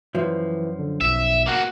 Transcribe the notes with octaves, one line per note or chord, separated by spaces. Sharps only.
F#2 E3 F3
D3
B1 E5
A#3 F#4